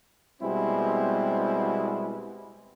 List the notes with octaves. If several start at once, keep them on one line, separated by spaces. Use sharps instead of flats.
B2 G3 G#3 B3 C4 E4